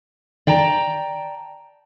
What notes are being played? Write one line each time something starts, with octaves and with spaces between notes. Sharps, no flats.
D5 G5 A5 A#5